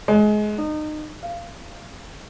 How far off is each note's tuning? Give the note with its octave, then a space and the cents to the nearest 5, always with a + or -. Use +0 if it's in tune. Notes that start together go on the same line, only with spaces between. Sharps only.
G#3 +25
D#4 -30
F5 -20